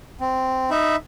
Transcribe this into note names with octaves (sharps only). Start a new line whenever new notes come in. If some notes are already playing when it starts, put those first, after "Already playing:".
C4
D#4 E5 B5